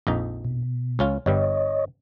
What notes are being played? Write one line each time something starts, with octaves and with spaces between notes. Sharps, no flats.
A#1 F2 D#4
B2
C#2 C#4 F4
G1 G2 G3 C#5 D#5